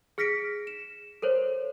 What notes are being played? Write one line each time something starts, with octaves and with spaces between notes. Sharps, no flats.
G#4 F6 A#6 B6 C#7 D7
E7
A4 A#4 C5 C#5